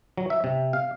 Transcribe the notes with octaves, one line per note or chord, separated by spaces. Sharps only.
F#3
E5
C3
F5